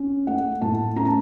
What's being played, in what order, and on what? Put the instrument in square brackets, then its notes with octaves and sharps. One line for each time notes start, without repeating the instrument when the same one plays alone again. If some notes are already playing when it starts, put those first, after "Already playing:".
Already playing: [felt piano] C#4
A3 F#5
A2 A5
C#4 A#5
A5